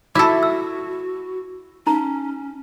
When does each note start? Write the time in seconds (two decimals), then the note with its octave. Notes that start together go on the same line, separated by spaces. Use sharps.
0.15 E4 F#4 A4 D6 E6
0.43 E6
1.87 C#4 D#4 A#5